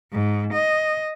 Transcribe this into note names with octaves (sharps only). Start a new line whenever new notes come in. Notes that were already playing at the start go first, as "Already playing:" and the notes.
G#2
D#5